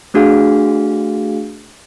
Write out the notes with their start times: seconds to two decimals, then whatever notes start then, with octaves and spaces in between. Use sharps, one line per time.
0.14 A3 D4 F#4 G#4 F5